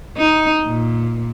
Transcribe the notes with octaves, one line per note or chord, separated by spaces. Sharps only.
D#4
A#2